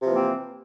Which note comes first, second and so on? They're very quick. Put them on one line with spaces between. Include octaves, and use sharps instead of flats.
C3 F3 E3 A#3 C4